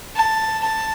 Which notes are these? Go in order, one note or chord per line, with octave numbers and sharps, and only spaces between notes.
A5
A5